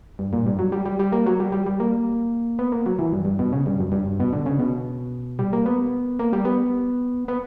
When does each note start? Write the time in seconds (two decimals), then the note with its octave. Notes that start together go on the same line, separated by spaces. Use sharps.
0.19 G2
0.33 A#2
0.46 G2
0.59 F#3
0.72 G3
0.86 G3
0.99 G3
1.12 A#3
1.26 F#3
1.40 G3
1.52 G3
1.66 G3
1.80 A#3
2.59 B3
2.72 A#3
2.86 F#3
2.99 E3
3.13 G2
3.25 G2
3.39 B2
3.52 C#3
3.66 G2
3.80 F#2
3.92 G2
4.20 B2
4.33 D3
4.46 C#3
4.59 B2
5.39 G3
5.53 A#3
5.66 B3
6.19 A#3
6.33 G3
6.45 B3
7.28 B3